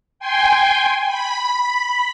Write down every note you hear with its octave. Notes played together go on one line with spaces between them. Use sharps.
G5 G#5 C6
B5